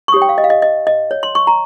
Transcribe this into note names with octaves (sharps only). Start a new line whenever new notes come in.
C#6
D#4 G4 C#5 D#6
G5
F5
D#5
F5
D#5
D#5
D#5
C#5
C6
C#6
A#5